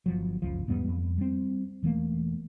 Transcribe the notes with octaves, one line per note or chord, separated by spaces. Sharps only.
G1 F3 F#3
F#1 C#2 F3
E2 G#2 G3 B3
F2
G3 C4
E1 E3 A3 A#3